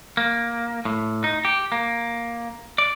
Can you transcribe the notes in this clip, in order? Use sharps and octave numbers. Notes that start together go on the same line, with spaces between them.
A#3
A2
D#4
G4
A#3
D5